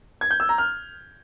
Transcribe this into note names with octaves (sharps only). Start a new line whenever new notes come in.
G#6
G6
E6
A#5
F6